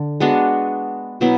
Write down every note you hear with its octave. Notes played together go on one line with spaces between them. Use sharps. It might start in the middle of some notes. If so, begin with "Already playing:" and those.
Already playing: D3
G#3 B3 D4 F#4
B2 F#3 B3 E4